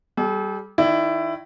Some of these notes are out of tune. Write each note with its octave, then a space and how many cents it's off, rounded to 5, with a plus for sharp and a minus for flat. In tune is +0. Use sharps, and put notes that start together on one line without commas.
G3 -5 A4 -45
D#3 +0 E4 +20 D5 +35